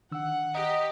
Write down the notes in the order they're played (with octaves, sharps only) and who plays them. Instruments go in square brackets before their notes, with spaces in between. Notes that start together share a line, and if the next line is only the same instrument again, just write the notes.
[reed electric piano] D#3 D4 E6 [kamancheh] F#5
[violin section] G4 [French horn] D#5 [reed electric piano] A#5